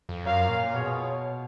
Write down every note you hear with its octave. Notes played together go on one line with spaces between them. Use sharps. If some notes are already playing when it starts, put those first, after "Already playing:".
F2
F#2 F4 A#4 C#5 F5
A#2
B2 B3 F4 G#4 C#5